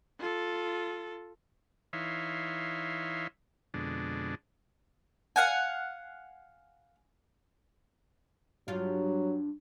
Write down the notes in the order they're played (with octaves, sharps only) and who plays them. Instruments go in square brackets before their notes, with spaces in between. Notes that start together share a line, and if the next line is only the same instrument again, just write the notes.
[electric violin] F4 A4
[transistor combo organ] E3 D#4 C#5 E5 F5 C6
F2 B2 D3 G#3 D4
[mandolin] F5 F#5 G#5
[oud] G2 F4 [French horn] F#3